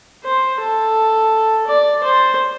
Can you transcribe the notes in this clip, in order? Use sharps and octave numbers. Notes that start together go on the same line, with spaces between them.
C5
A4
D5
C5